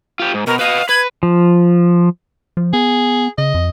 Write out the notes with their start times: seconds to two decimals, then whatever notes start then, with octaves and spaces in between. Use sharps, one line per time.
0.20 F4 G4
0.34 G#2
0.47 B2 A#4
0.59 B4 D#5 F5
0.89 B4 G#6
1.23 F3
2.57 F3
2.73 B3 G#4
3.38 C#3 D#5
3.54 F2